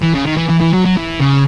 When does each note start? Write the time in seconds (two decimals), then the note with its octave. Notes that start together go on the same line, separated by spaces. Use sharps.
0.03 E3
0.14 C#3
0.26 D#3
0.37 E3
0.49 E3
0.61 E3
0.74 F#3
0.86 F#3
0.97 E3
1.20 C#3